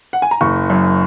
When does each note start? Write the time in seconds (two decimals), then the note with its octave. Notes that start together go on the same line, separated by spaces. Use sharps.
0.13 F#5
0.22 G#5
0.31 A#5
0.41 F#1 C#6
0.70 F#2